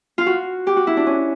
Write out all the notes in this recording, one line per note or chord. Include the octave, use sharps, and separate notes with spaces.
F4
F#4
G4
F#4
E4
D4
C#4